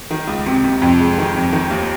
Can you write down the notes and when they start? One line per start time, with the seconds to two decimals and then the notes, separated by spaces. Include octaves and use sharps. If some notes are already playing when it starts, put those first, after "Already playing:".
0.11 D#3
0.28 C#2
0.46 C3
0.64 C3
0.82 F2
0.99 G#3
1.18 D#3
1.36 F2
1.53 D#3
1.71 D#2